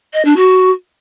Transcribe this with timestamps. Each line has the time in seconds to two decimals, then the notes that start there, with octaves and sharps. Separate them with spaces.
0.13 D#5
0.24 D4
0.36 F#4